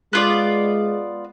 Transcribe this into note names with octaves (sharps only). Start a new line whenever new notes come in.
G#3 B3 F4 D5